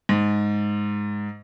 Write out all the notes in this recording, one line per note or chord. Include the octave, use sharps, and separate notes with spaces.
G#2